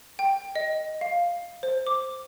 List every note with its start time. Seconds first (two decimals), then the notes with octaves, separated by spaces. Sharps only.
0.19 G5
0.56 D#5
1.01 F5
1.63 C5
1.87 D6